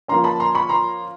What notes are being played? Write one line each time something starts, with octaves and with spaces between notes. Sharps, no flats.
F3 A#3 C#4 A#5 C6
A5 B5
A#5 C6
B5 C#6
A#5 C6